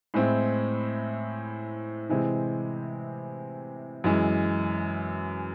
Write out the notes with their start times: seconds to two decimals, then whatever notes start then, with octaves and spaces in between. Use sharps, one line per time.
0.14 A2 G#3 C4 E4
2.09 C3 E3 G#3 C4 E4
4.04 F#2 E3 G#3